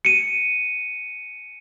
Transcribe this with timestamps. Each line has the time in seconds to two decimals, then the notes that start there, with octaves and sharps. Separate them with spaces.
0.05 C#7 D#7